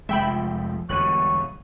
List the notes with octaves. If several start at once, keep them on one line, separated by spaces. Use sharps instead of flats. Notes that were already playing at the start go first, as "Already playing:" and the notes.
F1 F3 G#3 E5 G5 B5
E1 D3 G3 C#5 F#6 D#7